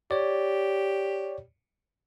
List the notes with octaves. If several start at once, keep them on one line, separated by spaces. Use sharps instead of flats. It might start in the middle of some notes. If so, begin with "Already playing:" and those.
G4 C#5 D5